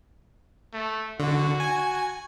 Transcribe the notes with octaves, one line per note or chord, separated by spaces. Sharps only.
A3
D3 F#4
G#5